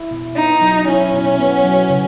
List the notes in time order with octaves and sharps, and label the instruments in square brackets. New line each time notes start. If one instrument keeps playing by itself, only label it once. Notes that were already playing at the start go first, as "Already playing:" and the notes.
Already playing: [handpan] E4
B2
[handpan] B3 [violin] D#4
[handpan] F#3
[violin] C#4 [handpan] E4
[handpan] B2
B3
F#3
C#3